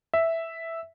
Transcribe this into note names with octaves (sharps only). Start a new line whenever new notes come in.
E5